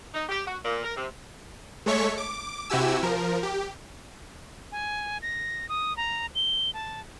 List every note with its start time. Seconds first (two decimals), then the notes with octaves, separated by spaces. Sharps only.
0.14 D#4
0.29 G4
0.46 F#4
0.65 A#2
0.84 A#4
0.96 C3
1.86 G#3 A3 A4 C#5 C#6 B6
2.18 D6
2.70 C3 E4 F#4 G4 G#5 E6
3.03 F3 A#4
3.43 G4
4.72 G#5
5.22 A#6
5.69 D#6
5.97 A#5
6.35 G7
6.74 A5